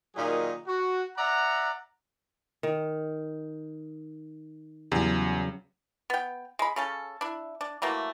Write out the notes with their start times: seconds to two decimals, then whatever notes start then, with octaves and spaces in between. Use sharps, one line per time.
0.16 A#2 D#3 F#3 D#4 G#4
0.67 F#4
1.18 D5 E5 F#5 A#5
2.63 D#3
4.92 E2 C#3 F#3 G3
6.10 B3 G5
6.59 G#3 B5
6.76 C#3 C#4 A4
7.21 D4 E4
7.61 D4
7.82 E3 F#3 A3 A#3